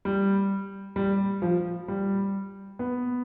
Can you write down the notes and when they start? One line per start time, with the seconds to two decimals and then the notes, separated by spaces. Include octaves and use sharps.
0.05 G3
0.96 G3
1.42 F3
1.88 G3
2.79 B3